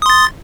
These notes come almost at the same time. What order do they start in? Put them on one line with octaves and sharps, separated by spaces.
D#6 C6 A6